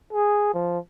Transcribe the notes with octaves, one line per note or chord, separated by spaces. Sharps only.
G#4
F3